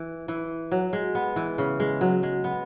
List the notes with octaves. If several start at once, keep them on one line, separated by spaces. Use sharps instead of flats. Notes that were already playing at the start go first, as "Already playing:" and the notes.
Already playing: E3
E3
F#3
G#3
B3
E3
C#3
G#3
F#3
G#3
B3